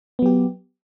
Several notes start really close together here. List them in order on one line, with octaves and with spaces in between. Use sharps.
B3 F#3 G4